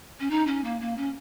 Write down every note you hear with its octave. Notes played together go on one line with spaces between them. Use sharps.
C#4
D#4
C#4
A#3
A#3
C#4